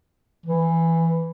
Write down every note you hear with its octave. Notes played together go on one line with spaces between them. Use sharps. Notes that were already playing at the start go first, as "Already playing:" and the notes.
E3